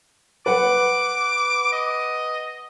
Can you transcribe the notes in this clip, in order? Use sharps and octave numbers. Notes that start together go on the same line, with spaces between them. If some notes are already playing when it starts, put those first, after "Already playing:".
B4 F#5 D6
D#5